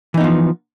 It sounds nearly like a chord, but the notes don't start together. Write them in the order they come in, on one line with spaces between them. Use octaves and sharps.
E3 D#4 B3 F3